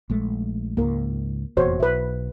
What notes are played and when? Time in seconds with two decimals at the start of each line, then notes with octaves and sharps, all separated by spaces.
0.10 A#1 G#3 A3
0.77 C#2 G#2 A#3 A#4
1.57 F1 E2 A#2 F#4 C5 C#5
1.80 B1 B4 E5